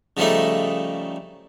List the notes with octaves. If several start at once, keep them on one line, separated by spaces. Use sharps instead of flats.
C#3 F3 G3 A3 D#4